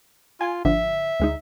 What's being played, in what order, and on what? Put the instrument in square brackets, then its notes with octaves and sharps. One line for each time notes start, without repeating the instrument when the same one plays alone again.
[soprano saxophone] F4 [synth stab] G#5
[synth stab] G#1 D3 F3 [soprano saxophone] E5
[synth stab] D2 G#3 D#4